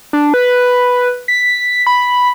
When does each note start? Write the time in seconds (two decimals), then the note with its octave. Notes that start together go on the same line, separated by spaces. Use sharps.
0.13 D4
0.34 B4
1.28 B6
1.87 B5